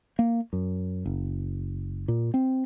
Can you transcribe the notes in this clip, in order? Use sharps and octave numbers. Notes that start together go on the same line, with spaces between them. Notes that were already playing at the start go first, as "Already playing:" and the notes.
A#3
F#2
F#1
A#2
C4